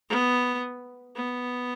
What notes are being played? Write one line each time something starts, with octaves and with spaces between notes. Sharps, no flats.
B3
B3